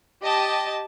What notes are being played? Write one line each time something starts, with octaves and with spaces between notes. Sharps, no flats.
G4 D#5 A5